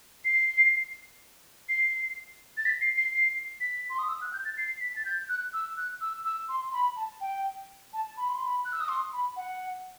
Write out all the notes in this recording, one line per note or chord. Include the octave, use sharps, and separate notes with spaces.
C7
C7
A6
B6
C7
C7
C7
B6
C6
D#6
E6
F#6
G6
A6
C7
B6
A6
G6
F#6
E6
F#6
E6
E6
C6
C6
B5
A5
G5
A5
B5
C6
B5
F#6
E6
D#6
C6
B5
F#5